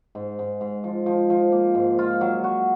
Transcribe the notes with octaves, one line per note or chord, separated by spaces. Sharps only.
G#2
G#2
G#2
F3
F3
F3
A#3
G#2
F4
F#3
F#4